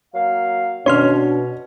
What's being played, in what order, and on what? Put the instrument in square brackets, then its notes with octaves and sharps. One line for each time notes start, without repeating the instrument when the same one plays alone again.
[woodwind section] F#3 A#3 F5
[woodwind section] B2 [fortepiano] C#4 [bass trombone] D4 [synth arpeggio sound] C#5 C6 F6